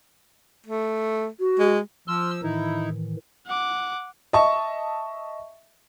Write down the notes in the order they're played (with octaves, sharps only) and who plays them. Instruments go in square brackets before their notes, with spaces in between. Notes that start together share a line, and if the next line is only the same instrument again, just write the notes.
[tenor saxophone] A3
[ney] F#4
[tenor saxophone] G#3
[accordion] F3 E6 [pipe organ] C6 F6
[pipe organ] A2 D#3 E3 [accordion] D#4 E4
[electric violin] F#5 D6
[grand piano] D#5 E5 A5 C#6